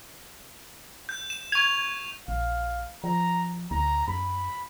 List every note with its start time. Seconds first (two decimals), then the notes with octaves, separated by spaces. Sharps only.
1.09 G6
1.30 E7
1.52 C#6 G#6 F7
2.28 A#1 F5
3.04 F3 A#5
3.71 D2 A#5
4.08 F#2 B5